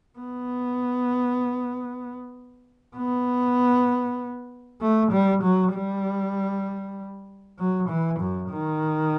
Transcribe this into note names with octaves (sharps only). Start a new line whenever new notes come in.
B3
B3
A3
G3
F#3
G3
F#3
E3
F#2
D#3